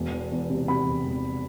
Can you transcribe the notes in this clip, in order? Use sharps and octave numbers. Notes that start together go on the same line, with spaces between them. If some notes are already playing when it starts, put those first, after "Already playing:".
Already playing: E1
E2
E2
C3
C3 B5
E1
E1